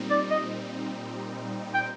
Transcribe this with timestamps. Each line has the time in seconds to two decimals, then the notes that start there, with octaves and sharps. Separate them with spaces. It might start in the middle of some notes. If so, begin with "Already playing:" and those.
Already playing: A#2 G3 C4 D#4
0.10 D5
0.31 D#5
1.75 G5